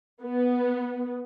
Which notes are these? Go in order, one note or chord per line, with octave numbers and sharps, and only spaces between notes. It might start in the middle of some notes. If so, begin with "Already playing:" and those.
B3